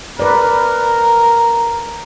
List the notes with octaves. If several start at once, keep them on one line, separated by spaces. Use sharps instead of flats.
A#4 B4 D5